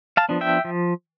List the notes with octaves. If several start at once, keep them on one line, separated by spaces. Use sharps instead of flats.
F5 A5
F3 B3 D4
E5 G5
F3